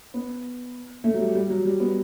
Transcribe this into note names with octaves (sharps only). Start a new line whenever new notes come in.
B3
A3
F#3
G3
G3
F#3
G3
B3